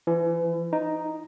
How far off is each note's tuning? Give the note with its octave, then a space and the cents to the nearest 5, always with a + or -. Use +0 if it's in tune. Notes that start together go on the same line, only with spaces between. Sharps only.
E3 +35
D#4 +0